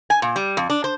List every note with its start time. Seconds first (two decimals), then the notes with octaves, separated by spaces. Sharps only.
0.10 G#5
0.22 A#2
0.36 G3
0.57 F2
0.70 D4
0.84 C5